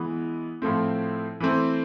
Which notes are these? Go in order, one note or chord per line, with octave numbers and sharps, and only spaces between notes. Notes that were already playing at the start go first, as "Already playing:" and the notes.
Already playing: E3 G#3 B3
A2 F3 A3 C4
E3 A3 C4 E4